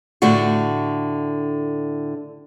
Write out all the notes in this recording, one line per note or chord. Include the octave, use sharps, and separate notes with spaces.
A2 D3 A3 D4 F#4